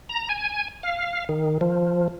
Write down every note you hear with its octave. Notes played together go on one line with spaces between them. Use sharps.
A#5
G#5
F5
D#3
F3